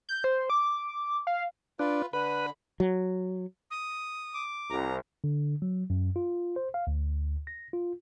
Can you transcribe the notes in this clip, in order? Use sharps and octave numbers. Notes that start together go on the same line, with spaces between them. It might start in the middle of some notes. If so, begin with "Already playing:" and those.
G6
C5
D6
F5
D4 F4 B4
D3 B4 B5
F#3
D#6
D6
C2 A#5
D3
F#3
F#2
F4
C5
F5
D2
A#6
F4